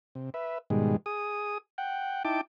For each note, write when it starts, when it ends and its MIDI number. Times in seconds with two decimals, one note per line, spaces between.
0.15 0.30 48
0.34 0.58 71
0.34 0.58 76
0.70 0.96 44
0.70 0.96 47
0.70 0.96 51
0.70 0.96 55
0.70 0.96 56
1.06 1.58 68
1.06 1.58 87
1.78 2.23 78
1.78 2.23 79
2.25 2.41 63
2.25 2.41 64
2.25 2.41 79
2.25 2.41 81
2.25 2.41 86